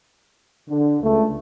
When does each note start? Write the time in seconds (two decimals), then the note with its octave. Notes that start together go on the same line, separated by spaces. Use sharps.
0.69 D3
1.02 C#2 A3